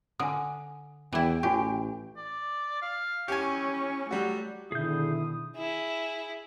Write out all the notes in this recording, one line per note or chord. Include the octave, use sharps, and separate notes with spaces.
D3 G#5 D#6
E2 E3 E4 G5
A1 F#4 G4 G#5 C#6
D5
F5
C#4 E4 G4 G#5 C#6
F#3 G3 A3 F#4
B2 D3 D#3 E4 G#4 D#6 G6
E4 G#4